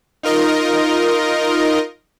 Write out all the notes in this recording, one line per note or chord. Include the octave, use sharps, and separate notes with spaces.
D#4 F4 A#4 D#5